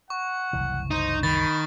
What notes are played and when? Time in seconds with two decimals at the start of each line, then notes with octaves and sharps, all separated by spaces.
0.10 F#5 C#6
0.53 F#1 C2 E3
0.91 D#4 C5
1.23 D#3 B5 A6